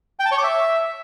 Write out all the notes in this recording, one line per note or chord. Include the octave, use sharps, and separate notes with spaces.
G5
A5
C#5
D6
E5